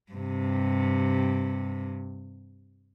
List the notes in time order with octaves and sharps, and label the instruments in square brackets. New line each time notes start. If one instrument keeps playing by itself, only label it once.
[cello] G2 C3